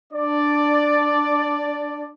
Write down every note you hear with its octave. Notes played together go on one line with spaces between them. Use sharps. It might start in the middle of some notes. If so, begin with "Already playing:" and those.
D4 D5